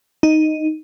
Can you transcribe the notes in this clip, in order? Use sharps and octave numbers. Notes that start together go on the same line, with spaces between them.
D#4